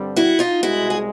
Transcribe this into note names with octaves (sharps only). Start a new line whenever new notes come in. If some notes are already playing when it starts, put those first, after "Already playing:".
Already playing: G2 D3 G3 C4
E4 F#4
D#4 F4
C2 B2 G#3 E4 F#4
G#4